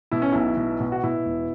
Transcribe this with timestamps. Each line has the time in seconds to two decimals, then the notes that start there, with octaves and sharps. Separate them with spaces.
0.11 B2 E4
0.22 C#4
0.32 B1 E4
0.57 B2
0.80 B2
0.92 F#4
1.04 B2 E4
1.26 E1